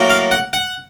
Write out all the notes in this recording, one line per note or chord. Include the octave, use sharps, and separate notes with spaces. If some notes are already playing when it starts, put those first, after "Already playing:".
Already playing: A2 F#3 A#3
F5
F#5
F#5